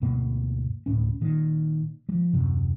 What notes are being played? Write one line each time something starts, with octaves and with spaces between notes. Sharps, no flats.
D2 G2 B2 A#3
E1 D2 A2 C#4
A#2 D#3
F3 G3
D#1 F#2 C3